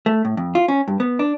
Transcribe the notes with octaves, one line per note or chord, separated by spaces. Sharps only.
A3
A2
F2
F4
C#4
G2
B3
D4